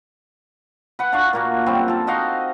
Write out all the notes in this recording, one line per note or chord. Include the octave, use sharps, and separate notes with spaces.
B4 F#5
D4 F5 C#6
A#2 A#3 F#4
F#2 G3 C4
F4 A4
D#4 F#4 D#5 F5